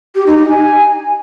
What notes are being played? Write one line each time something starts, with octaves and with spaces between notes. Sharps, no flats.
G4
D#4
D#4
G#5